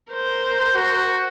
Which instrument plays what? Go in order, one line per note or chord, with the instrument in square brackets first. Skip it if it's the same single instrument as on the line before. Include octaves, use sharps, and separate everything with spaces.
[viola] A#4 C5
[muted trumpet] F#4